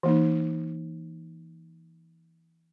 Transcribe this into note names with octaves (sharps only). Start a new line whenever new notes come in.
E3 A#3 D#4